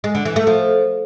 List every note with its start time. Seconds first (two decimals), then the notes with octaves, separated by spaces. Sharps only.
0.04 G#3
0.15 D3
0.25 E3
0.36 A3
0.47 F3